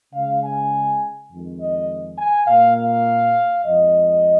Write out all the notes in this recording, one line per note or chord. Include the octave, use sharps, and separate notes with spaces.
C#3 G#3 F5
G#5
F2 D#3 G#3
D#5
G#5
A#2 A#3 F5
F5
F2 F3 G#3 D#5